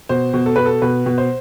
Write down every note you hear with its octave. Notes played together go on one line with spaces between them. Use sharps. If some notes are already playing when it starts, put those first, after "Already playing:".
B2 C5
B2
A4
B2 B4
A4
B2 B4
B2
C5